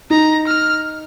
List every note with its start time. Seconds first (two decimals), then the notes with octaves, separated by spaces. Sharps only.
0.10 D#4 A#5
0.47 F6